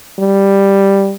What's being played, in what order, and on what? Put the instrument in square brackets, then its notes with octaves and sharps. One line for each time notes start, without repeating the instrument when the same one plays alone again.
[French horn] G3